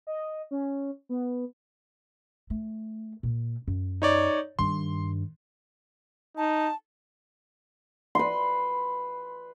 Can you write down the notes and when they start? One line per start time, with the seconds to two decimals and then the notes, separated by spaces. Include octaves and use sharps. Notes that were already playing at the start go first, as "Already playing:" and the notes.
0.07 D#5
0.51 C#4
1.09 B3
2.50 A3
3.23 A#2
3.67 F#2
4.02 D#4 C#5 D5
4.59 G2 D#3 C6
6.37 D#4 A5
8.15 B4 C6